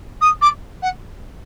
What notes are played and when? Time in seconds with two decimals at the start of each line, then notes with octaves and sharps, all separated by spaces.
0.22 D#6
0.42 D6
0.82 F#5